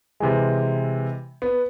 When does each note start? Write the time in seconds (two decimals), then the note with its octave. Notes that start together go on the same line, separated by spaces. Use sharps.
0.20 C3 E3 G#3
1.42 B3